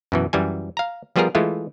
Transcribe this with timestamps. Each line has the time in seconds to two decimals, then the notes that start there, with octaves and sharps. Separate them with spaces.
0.12 F#2 B2 E3
0.33 F#2 E3 G3 G#5
0.77 F5 A#5
1.16 F3 G3 B3 F4 G#4 A#4
1.35 E3 G#3 A3 E4 F4